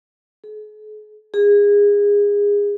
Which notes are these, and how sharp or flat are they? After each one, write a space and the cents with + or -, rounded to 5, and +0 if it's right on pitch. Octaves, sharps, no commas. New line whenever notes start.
G#4 +45
G#4 -25